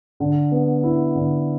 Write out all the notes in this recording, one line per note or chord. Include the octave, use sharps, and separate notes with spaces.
D3
B3
E4
D3